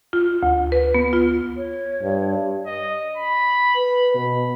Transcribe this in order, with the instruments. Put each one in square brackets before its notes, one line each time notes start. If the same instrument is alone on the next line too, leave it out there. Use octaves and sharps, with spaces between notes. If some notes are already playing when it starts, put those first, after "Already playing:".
[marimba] F4
D2
B4
B3
F4
[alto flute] C#5
[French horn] G2
[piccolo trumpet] D#5
B5
[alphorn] B4
B2